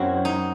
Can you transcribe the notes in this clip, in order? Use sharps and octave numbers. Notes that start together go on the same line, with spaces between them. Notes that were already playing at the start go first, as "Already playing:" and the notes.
Already playing: F#2 F#3 C4 E4
D#4